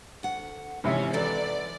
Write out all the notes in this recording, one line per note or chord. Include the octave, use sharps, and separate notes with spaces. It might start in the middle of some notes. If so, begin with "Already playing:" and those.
D2 F#5
G#1 C3 E3 C#4 E5
E3 F#3 A4 D5